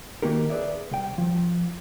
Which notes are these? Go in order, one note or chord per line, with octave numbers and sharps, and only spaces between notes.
D#3 A#3 F#4 G4 A#4
G#4 B4 D5 E5
C2 G5
F3